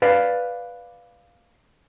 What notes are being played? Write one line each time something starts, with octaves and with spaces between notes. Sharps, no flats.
B4 D5 F5